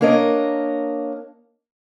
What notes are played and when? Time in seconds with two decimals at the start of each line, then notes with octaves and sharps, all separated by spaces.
0.01 A#3 D4 A#4 C#5 D#5